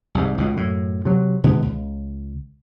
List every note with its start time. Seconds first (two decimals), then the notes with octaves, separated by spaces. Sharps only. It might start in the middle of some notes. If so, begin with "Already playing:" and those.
0.15 C2 G#2
0.38 C#2 B2
0.54 F#2 A2
1.05 C3 F#3
1.44 B2 D#3 G#3 B3
1.62 C#2